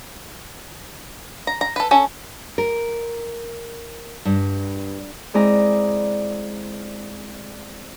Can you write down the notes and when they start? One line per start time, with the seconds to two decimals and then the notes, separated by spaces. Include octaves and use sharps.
1.47 A#5
1.61 A#5
1.76 A4 B4
1.91 C#4 A4
2.58 A#4
4.25 G2
5.34 G#3 C4 E4 G#4 D5 A#5